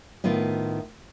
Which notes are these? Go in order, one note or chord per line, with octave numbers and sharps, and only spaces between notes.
A2 D#3 B3 F4